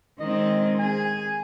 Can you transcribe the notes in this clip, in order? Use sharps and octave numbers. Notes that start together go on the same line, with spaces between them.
D#3 G#3 C4 D#5
G#4 G#5